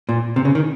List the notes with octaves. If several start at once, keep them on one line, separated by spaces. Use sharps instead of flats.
A#2
C3
C#3
D#3